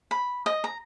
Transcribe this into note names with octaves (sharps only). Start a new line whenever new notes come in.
B5
D#5
A#5